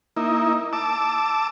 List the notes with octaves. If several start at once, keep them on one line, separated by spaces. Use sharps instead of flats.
A#3 D#4 E4
A5 D6 E6